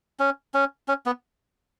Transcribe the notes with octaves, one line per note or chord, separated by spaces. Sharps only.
C#4
C#4
C#4
B3